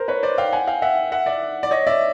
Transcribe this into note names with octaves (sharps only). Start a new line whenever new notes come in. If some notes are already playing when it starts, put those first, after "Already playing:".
Already playing: A#4 C5
B4 C#5
C5 D5
F5 G5
F#5 G#5
F5 G5
E5 F#5
E5 F#5
D5 E5
D5
C#5 D#5
D5 E5